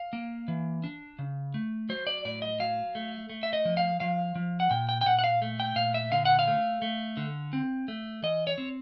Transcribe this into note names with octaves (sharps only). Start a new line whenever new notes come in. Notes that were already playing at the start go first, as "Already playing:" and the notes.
Already playing: F5
A#3
E3
D4
C#3
A3
F#3 C5
D5
A2 D5
D#5
F#3 F5
A3
A3
E5
D#5
F3
F5
F3 F5
F3
F#5
A#2 G5
G5
G5
A#2 F#5
F#5
F5
A3
G5
A#2 F5
E5
D3 F5
F#5
F5
A3
A3
D3
C4
A3
E3 D#5
C#5
C4